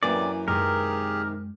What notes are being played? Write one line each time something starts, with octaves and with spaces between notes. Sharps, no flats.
F#2 A2 C3 E3 A#3 D5
F#2 C3 D#3 G#3 G4 G#4 A#4